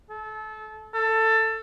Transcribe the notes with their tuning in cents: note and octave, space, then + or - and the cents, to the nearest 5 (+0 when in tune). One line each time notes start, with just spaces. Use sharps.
A4 -25
A4 +15